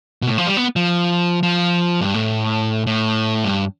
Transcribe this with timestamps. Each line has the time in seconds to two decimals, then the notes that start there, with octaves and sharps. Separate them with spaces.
0.22 B2
0.27 A2
0.38 F3
0.47 G3
0.57 B3
0.76 F3
1.43 F3
2.01 G2
2.14 A2
2.87 A2
3.44 G2